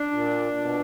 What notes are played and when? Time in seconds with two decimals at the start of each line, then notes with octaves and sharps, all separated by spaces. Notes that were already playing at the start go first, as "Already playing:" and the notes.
Already playing: D4
0.11 A#2
0.56 B2